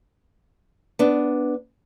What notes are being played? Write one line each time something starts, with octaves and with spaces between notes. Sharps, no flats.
B3 D4